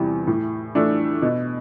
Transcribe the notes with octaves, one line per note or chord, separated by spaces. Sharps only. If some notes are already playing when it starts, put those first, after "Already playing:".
Already playing: E2 C3 E3 G3
A2
E3 A3 D4
B2